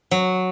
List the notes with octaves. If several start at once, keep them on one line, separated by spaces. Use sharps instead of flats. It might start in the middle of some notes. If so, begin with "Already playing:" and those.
F#3